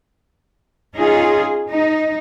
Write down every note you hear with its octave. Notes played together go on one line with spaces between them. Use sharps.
C#4 D#4 F4 G#4
D#4